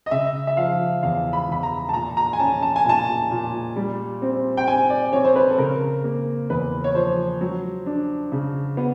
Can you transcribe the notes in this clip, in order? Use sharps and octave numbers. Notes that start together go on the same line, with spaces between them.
D#5
C#3 E5
E5
F3 F5
E2 F5
B5
E2 B5
A#5
A5
A#2 A#5
A#5
G#5
C#4 A5
A5
G#5
A#2 A5
A#2
G3
C4
G5
C4 G#5
D5
C4 C#5
C5
B4
A4
C#3 A#4
A#3
E2 B4
C#5
F3 C5
F#3
D4
C#3
B3